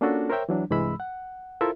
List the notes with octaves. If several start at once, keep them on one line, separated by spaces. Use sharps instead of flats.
A#3 C#4 D4 F4 F#4 A4
A#4 C5 C#5 E5 G5
E3 F#3 D4
C2 G2 E3 G#3 B5 E6
F#5
E4 F4 A4 A#4 C5 E5